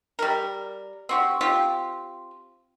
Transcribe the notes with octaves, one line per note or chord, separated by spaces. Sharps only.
G3 A#4
C4 F#4 G4
C4 F4 G4